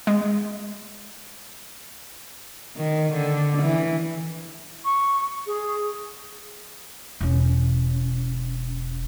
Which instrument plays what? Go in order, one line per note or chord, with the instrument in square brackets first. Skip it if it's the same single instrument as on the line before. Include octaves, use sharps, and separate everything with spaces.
[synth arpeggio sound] G#3
[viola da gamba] D#3
D3
E3
[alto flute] C#6
G#4
[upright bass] E1 C#4